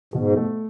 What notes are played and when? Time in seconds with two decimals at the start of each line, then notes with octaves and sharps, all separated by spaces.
0.14 G#2 B2
0.36 A3